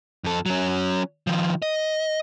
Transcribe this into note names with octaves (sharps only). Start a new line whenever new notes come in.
F2 A4
F#3 C#4
D#3 F3
D#5